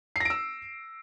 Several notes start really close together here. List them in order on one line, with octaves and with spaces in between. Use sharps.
C7 A#6 D7 E6